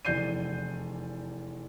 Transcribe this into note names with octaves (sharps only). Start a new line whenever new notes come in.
F1 E2 D5 G6 C7 D#7